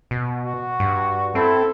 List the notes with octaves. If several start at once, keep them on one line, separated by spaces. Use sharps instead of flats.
B2
F#4
G2
C4 E4 A4